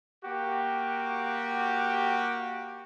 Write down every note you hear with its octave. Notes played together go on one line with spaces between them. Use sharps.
A#3 F#4 G4